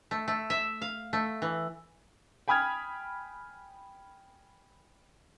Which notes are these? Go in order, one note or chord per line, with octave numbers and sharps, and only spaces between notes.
A3
A3
E5
F5
A3
E3
G5 G#5 B5 D#6 F6 G#6